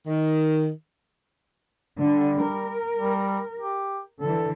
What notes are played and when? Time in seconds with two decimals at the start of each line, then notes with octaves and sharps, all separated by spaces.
0.07 D#3
1.99 D3 G3
2.44 A#4
2.96 G3
3.59 G4
4.20 D3 E3 A4